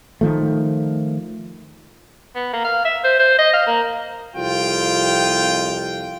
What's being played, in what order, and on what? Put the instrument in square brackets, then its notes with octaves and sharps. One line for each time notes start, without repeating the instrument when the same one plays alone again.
[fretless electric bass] D#3 F3 A3
[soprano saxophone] B3
A#3
F5
E5
C5
C5
D#5
F5
A#3
[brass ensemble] C2 F2 F4 G5